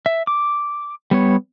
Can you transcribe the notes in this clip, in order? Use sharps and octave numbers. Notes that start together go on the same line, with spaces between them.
E5
D6
G3 B3 C#5